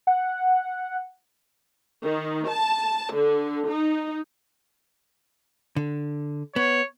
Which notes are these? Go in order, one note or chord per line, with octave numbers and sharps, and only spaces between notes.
F#5
D#3
A5
D3
D#4
D3
B3 C#5